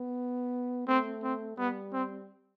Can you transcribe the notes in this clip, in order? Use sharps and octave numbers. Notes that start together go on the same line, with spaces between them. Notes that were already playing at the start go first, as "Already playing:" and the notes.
Already playing: B3
A3 C4
C4
G3 B3
C4